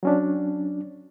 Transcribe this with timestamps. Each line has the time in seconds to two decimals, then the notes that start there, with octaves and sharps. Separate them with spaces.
0.03 F#3 C#4 D4